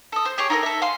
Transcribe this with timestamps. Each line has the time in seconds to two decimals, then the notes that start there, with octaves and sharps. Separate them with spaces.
0.12 A4 D#6
0.25 C5
0.38 G4 G#4 C#5 G5
0.50 D#4 F4 A4 A#4
0.63 A4 E5
0.82 F5 G#5 C6